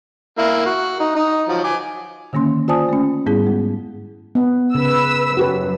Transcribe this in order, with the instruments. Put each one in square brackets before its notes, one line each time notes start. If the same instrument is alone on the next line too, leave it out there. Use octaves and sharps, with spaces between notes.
[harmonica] A#3 E4
F#4
D#4
D#4
F3 F#3
G#5 D6
[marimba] D3 D#3 A#3 C#4 C6
F4 C5 D5 G#5 A5 D#6
A3 C#4
G#2 G3 B3 E4 G#4
G#3
[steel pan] B3
[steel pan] C#3 [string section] B4 E6
[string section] F#2 [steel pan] F#4 G4 B4